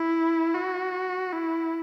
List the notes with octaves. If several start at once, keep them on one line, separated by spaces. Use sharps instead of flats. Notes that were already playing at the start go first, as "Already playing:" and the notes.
Already playing: E4
F#4
E4